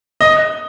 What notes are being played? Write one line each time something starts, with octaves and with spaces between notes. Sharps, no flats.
D#5